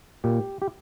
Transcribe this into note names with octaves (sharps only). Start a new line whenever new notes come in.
A#2 G4
G4